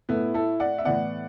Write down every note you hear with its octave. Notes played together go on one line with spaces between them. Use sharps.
A2 A3 B3 E4
E4 A4
D5 F#5
E5
A2 E3 B3 D5 F#5